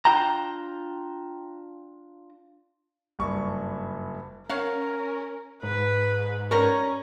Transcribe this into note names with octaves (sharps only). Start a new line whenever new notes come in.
D4 F4 G5 A5 A#5
F#1 G2 C#6
C#4 A#4 C#5 F5 F#5
G#2 B4
G3 C#4 A#4 A#5 C#6